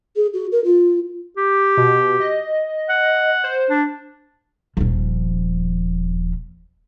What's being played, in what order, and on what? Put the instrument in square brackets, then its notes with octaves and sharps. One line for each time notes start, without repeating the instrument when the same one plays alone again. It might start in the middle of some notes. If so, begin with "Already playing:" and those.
[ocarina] G#4
F#4
A#4
F4
[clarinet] G4
[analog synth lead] B2
D#5
[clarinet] F#5
[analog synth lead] C5
[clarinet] D4
[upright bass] D#1 F3